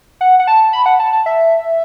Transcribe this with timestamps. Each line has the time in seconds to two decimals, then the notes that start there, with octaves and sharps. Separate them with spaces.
0.21 F#5
0.39 F#5
0.47 A5
0.73 B5
0.86 F#5
0.99 A5
1.13 A5
1.26 E5